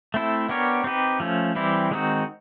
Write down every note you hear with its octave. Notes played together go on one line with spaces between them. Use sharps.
A3 C4 E4 A4
B3 D4 G4 A#4 C#5
C4 D#4 G4 B4
F3 A3 C#4
E3 G3 C4 E4 G4
D#3 G#3 C4 D#4 F#4